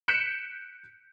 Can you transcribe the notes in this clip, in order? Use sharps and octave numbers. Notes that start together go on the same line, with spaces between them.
F#6 G6 B6 C#7 D7 E7